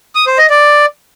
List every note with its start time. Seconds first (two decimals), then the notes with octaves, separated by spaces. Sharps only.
0.15 D#6
0.27 C5
0.38 D#5
0.50 D5